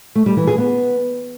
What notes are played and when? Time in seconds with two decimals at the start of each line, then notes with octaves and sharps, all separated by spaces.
0.15 A3
0.26 G3
0.37 E3
0.47 G#4
0.58 B3